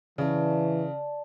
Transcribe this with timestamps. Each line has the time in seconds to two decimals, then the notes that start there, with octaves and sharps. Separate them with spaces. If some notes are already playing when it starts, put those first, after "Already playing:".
0.18 C#3 E3 D5 A5